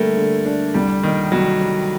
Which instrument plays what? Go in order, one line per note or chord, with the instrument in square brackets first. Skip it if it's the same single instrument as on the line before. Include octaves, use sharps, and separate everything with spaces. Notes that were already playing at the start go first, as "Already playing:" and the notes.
Already playing: [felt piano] D3 G3 [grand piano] A3 A#3
[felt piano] D3
D4
[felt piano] C2 [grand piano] G3
[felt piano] A#2 [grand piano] D#3
[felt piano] C2 [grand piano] F#3
[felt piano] G3